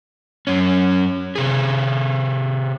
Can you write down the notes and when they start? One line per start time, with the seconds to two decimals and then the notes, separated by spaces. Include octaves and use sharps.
0.47 F#2 C#4
1.35 C3 G#4